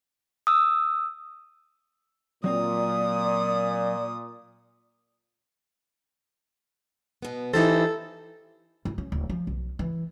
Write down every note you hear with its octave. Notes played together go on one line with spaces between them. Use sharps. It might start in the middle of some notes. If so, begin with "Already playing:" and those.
D#6 E6
A#2 F#3 C4 D5 A#5 D#6
B2 B3
E3 D#4 G4 A4 C5
E4
C#4
D1
F3
B1
E3